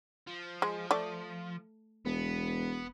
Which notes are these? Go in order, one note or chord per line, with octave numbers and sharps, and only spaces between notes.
F3
G#3
A3 D5
E1 B3